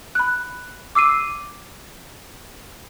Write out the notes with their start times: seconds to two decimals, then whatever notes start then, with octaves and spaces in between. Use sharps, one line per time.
0.15 B5 F#6
0.95 D6 E6 C7 D#7